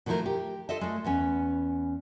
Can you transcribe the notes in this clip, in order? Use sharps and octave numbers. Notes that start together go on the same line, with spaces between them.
B2 D#3 F3 A3 E4 A#4
G4
F4 A4 D#5 E5
G#3 A3
E2 B3 C#4